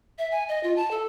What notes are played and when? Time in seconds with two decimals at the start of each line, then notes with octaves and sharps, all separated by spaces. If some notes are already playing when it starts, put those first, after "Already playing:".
0.18 E5
0.32 G#5
0.49 D#5
0.63 F4
0.76 A5
0.91 A4